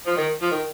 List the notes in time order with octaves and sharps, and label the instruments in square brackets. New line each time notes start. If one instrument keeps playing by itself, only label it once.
[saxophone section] F3
D#3
F3
D#3